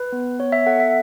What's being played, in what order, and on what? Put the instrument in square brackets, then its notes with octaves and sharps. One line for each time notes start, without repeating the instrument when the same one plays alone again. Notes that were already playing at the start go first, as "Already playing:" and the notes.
Already playing: [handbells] B4
B3
B3 C#5
E5
A4 F#5
E5